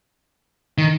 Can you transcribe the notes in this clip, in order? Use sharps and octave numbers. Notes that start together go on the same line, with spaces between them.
D#3